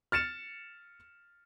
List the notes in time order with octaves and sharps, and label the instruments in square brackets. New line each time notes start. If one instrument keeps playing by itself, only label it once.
[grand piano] F6 A6 C#7 E7